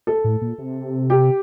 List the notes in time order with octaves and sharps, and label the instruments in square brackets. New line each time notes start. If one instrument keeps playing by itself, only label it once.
[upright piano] A4
[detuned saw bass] A2
A#2
C3
[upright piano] G4